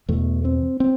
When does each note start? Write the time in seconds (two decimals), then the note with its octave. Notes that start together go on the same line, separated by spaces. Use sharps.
0.09 E2 B2 A3
0.45 C4
0.80 C4